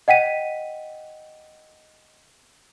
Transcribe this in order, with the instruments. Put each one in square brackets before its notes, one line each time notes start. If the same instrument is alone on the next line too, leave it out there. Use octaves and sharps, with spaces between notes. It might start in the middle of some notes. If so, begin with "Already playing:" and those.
[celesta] D#5 F#5 G5 B6 D#7